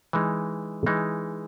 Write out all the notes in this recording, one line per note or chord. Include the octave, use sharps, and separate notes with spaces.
E3 G#3 D#4
E3 G#3 D#4